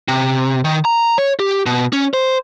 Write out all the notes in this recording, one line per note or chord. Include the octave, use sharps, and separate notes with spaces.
C3
D#3
A#5
C#5
G4
B2
C#4
C5